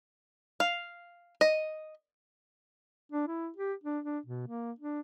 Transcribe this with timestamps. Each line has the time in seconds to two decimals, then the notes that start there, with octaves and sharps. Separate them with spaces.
0.60 F5
1.41 D#5
3.12 D4
3.28 E4
3.57 G4
3.84 D4
4.04 D4
4.26 B2
4.48 A#3
4.79 D4